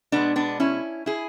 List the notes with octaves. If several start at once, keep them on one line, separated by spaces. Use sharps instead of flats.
B2 G#3 B3 D4
B3 D4
C#4 E4
E4 G#4